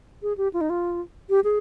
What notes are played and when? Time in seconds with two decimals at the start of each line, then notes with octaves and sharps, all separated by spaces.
0.23 G#4
0.38 G4
0.54 F4
0.61 D#4
0.70 F4
1.30 G4
1.44 G#4